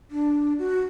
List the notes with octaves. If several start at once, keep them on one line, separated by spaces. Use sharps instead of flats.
D4
F#4